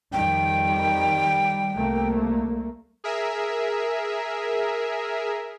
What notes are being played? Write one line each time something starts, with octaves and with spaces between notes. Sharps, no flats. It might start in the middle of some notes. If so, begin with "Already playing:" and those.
F2 D#3 G3 G5
C2 A3 A#3
G#4 A#4 E5